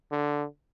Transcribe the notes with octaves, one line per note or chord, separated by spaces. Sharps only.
D3